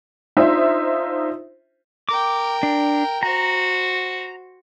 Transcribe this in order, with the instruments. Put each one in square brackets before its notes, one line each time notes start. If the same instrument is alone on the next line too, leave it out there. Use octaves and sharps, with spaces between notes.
[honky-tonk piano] D4 D#4 F4 C5 E5
[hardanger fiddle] A#4 G5 [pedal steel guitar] D6
[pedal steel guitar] D4
[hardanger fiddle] F#4 C5 [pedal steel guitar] A#5